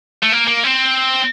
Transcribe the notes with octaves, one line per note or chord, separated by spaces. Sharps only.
A3
A#3
A#3
C4